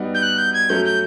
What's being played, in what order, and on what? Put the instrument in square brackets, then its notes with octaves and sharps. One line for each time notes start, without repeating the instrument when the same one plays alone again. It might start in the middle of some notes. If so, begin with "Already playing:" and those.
Already playing: [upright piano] G3 B3 D#4 F#4
[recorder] G6
F#6
G6
G#6
[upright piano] F#3 A3 C#4 [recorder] G6
[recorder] G6